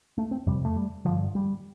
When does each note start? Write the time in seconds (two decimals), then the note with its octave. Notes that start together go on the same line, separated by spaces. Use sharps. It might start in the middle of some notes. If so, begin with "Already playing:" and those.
0.18 A3
0.31 C4
0.46 F2 C3 G3
0.65 A3
0.76 G3
1.05 G2 D3 F3
1.35 G3